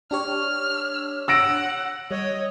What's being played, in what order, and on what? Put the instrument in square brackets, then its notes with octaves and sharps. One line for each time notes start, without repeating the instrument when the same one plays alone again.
[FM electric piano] D4 G4 C#5 [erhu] F6
[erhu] F#5 [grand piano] E6 A#6 D7
[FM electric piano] G3 [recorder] C#5 [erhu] D#5